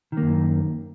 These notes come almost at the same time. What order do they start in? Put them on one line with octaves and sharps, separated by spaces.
D#3 A#3 F#2